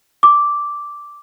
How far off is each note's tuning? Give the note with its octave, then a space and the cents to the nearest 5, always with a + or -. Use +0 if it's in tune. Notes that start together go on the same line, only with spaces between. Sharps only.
D6 -5